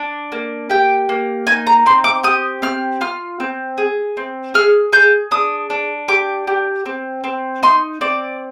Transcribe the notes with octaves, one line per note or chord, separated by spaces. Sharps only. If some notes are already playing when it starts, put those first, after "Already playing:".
Already playing: D4
A#3
G4 G5
A#3
D#4 G#5
A#5
C4 C6
D6
G4 D#6
C4 F6
F4 F6
C4
G#4
C4
G#4 F6
G#4 G6
D4 D#6
D4
G4 D6
G4
C4
C4
D#4 C6
C4 D5